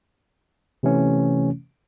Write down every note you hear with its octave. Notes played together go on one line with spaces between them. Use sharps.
C3 E3 A3 C#4